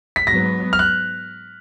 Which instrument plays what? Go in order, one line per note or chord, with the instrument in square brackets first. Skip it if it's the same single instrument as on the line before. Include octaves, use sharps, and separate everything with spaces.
[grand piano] B6
[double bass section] G#2 F#3 B3 [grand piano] A#6
[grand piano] F6
F#6